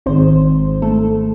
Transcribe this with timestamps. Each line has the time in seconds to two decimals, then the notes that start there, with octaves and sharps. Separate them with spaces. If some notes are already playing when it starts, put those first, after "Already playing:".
0.06 G#1 G#2 D#3 G#3 C4 C5
0.82 A3 A4